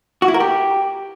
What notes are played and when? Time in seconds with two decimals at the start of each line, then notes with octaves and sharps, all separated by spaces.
0.22 F#4
0.28 E4
0.34 A#4
0.40 G4